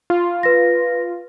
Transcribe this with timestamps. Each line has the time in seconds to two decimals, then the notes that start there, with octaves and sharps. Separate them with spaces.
0.10 F4
0.43 B4 A#6